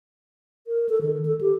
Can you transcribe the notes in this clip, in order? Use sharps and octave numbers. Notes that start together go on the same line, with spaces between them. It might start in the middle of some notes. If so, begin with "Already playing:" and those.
A#4
A4
D#3
A4
G4